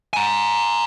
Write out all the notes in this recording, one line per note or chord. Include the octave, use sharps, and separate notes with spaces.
G#5 A#5